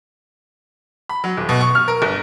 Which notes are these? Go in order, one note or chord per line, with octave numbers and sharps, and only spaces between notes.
B5
F#3
D#1
B2
C#6
F6
A#4
G1